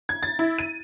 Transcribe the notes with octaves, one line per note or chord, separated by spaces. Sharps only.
G#6
A6
E4
D#7